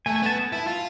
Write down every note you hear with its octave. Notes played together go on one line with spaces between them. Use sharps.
A3 G#5
G#5
B3 A5
A5
E4
F4